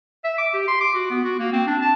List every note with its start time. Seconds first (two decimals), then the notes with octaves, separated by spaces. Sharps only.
0.24 E5
0.38 D6
0.54 G4
0.68 C6
0.81 D6
0.95 F#4
1.10 B3
1.24 F#4
1.39 A#3
1.53 C4
1.67 D4
1.82 A5